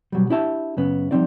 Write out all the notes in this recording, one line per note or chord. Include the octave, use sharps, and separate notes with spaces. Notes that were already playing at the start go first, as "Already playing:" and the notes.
B2 F#3 G3
D4 E4 G4 E5 A5
F#2 C#3 B3
F3 G3 A#3 C4 D#4 D5